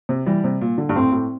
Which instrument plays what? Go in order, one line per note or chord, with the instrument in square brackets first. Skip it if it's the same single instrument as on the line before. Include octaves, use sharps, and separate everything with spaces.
[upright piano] C3
[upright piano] E3 [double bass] G3
[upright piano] C3
A#2
D3
G2
[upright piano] A2 [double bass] C4
[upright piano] A2